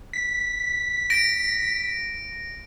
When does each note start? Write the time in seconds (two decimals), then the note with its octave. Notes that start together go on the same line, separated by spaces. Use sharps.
0.13 B6
1.10 A#6 D7